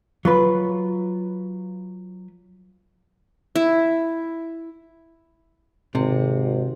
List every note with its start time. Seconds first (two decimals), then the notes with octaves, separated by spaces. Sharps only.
0.25 F#3 F4 B4
3.56 E4
5.95 G#1 C3